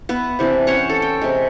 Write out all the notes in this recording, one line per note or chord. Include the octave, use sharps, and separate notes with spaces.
B3 B4 E5
C3 E3 C4 D4
C#4 C5 C#5 F#5
A4
G5
C3 G#3